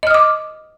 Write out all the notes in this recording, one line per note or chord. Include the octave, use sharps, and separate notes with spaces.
D#5 D6 D#6 F6